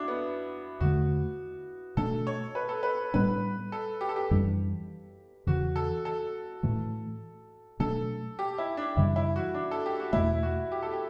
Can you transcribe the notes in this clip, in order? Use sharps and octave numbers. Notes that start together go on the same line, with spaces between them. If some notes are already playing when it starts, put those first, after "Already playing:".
Already playing: D4 E4 F#4
B3
E2 D3 A3 F#4
B2 A3 D4 A4
C#5
B4
A4
B4
A2 G3 B3 D4 B4
A4
G4
A4
G4
F#2 E3 G3 D4
E2 C#3 E3 F#4
A4
A4
A2 E3 A3
B2 F#3 A3 D4 A4
G4
E4
D4
F#2 C#3 E3 G3 E4
E4
F#4
D4
A4
G4
F#4
E2 B2 A3 E4
F#4
G4
A4
G4